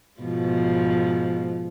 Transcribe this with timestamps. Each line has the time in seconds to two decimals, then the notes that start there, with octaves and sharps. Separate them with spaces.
0.21 G#2 B2 F3